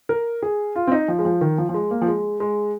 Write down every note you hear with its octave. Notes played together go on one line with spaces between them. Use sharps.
A#4
G#4
F4
C4
D#4
F3
G#3
F3
D#3
F3
F3
G#3
A#3
F3
G#3
G#3